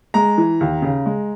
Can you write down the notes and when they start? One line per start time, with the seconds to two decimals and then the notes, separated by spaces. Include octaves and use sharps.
0.14 G#3 A#5
0.38 E3
0.61 D#2
0.82 C#3
1.06 G#3